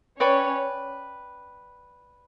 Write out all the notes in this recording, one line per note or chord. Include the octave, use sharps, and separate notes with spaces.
C#4 B4 C#5 D5 G5 C#6